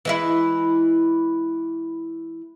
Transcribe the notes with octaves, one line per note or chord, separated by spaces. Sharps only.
E3 G#3 E4